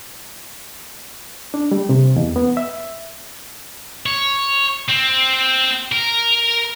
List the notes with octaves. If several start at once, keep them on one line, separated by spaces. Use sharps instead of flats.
D4
G3
C3
E2
B3
E5
C#5
C4
A#4